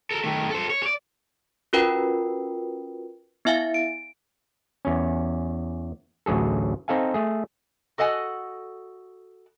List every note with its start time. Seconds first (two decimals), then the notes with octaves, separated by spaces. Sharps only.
0.11 A4 A#4
0.24 D#3 A3
0.51 A4 C5
0.70 C#5
0.83 C#5 D5
1.73 C#4 F4 F#4 A#4 B4 G5
3.45 B3 E4 E5 F5 G#5 A6
3.74 D7
4.85 E2 C#4
6.26 A1 D2 F#3 G#4 A4
6.88 C4 D#4 A4 F5 G#5
7.14 A3 G#4
7.98 F#4 A4 D#5 F#5 G#5